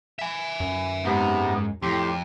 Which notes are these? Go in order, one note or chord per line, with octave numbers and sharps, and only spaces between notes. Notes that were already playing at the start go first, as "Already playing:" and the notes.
E5 G#5
F#2
G#2 C3 B3
F2 A2 G4 C6